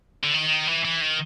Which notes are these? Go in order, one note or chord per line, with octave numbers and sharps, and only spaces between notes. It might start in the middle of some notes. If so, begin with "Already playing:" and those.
D3
D#3
E3
E3
D#3